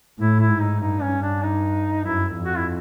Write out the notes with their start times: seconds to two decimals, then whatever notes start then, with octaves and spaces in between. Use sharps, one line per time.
0.19 A2 E4
0.40 E4
0.49 G#2
0.60 D#4
0.80 G2 D#4
1.01 C#4
1.22 D4
1.42 D#4
2.04 F#2 E4
2.35 F2
2.45 F#4
2.57 E4